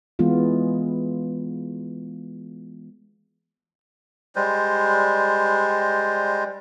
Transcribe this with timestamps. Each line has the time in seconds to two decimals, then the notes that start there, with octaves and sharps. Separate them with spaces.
0.19 E3 G#3 B3 F4
4.36 G3 G#3 C5